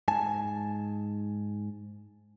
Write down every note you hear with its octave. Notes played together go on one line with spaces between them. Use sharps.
G#2 G#5 A5